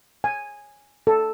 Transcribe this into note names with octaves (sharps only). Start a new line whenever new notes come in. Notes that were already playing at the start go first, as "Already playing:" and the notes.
G#5
A4